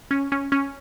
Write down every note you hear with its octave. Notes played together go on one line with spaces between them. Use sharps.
C#4
C#4
C#4